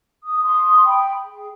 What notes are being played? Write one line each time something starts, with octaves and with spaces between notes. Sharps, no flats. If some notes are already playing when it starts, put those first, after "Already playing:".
D#6
C6 D#6
G5 B5
G#4